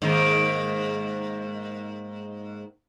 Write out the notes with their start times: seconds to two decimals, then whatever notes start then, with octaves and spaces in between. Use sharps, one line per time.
0.02 G#2 D#3 A#3